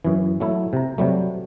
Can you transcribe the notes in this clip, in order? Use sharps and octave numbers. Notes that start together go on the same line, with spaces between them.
F#2 E3
F#3 A3 E4
C3 A#5
C3 F#3 G3 A3